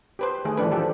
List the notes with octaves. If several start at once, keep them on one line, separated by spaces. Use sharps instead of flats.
G4 B4 C5
D#3 A3 G#4
E3 F3 D4 B4
F3 G4 A4